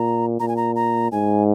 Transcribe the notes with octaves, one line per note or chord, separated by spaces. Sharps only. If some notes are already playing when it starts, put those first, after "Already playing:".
Already playing: A#2 A#5
A#2 A#5
G#5
A#5
A#5
G#2 G#5